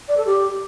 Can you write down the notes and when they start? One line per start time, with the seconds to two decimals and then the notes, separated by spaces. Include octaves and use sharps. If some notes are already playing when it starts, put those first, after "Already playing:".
0.08 D5
0.17 A4
0.26 G4